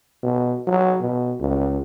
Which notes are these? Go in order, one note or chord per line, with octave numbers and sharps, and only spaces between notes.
B2
F#3
B2
C#2